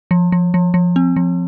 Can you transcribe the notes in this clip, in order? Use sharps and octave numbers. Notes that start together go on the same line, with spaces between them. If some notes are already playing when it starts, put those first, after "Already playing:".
F3
F3
F3
F3
C4
F3